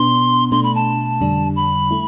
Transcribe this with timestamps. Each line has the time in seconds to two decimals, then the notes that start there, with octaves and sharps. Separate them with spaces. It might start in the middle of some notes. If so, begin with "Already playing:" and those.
Already playing: B2 B3 D4 C6
0.51 B2 A3 D4 C6
0.63 B5
0.75 A5
1.21 F2 D3 G3 D4
1.56 B5
1.91 A3 E4